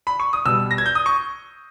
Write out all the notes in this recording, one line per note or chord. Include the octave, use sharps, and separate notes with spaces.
B5
C#6
D#6
B2 G3 E6
A#6
G#6
G6
D#6
C#6